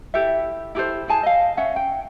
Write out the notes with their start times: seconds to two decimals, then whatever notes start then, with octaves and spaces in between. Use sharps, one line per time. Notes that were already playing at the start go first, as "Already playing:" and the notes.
0.14 E4 G4 A4 E5
0.75 E4 G4 A4 C5
1.08 E4 G#4 G#5 A5
1.23 D#5 F5
1.57 C#4 E5 F#5
1.76 G5